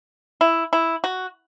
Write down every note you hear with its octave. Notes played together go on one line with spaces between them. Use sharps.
E4
E4
F#4